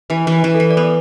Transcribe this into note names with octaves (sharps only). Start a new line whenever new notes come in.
E3 B4
E3
B4
E3
A4
E3
D5
B3 B4